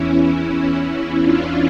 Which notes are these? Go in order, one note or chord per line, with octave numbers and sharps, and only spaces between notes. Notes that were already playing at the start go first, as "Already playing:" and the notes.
Already playing: E2 E3 C#4 E4
D4 F4